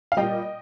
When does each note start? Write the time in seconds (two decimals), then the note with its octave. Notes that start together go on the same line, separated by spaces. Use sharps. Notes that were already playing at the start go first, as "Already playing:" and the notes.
0.12 F5
0.17 A#2 G3 D#5 G5